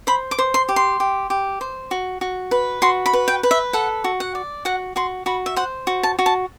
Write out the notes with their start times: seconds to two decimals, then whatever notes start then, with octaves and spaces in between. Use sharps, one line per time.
0.07 C5 B5
0.31 D6
0.39 C5
0.54 C6
0.69 G4
0.76 C6
1.00 G4
1.30 G4
1.61 C5
1.91 F#4
2.21 F#4
2.51 B4
2.82 F#4 C6
3.06 B5
3.13 B4
3.28 G5
3.43 B4
3.51 E5
3.73 A4 F#5
4.04 F#4
4.20 F#5
4.35 D5
4.65 F#4 F#5
4.96 F#4 C6
5.26 F#4 B5
5.46 E5
5.56 C5 F#5
5.87 F#4
6.03 A5
6.19 F#4
6.26 A5